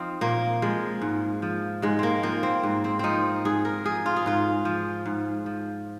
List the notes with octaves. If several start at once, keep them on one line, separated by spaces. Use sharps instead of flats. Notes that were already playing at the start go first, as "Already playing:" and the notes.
Already playing: F3 C4 D#4 F4
A#2 A#3
F3 G#3
G#2
F3
G#2 G#3
A#3 C4
F3 A#3
C4
G#2
C4
F3 C4 D#4
G#2 G#4
A#4
F3 G#4
F4
G#4
G#2 F4
F3
G#2
F3